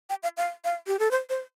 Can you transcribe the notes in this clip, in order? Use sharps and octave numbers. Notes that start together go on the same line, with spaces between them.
G5
F5
F5
F5
G4
A4
C5
C5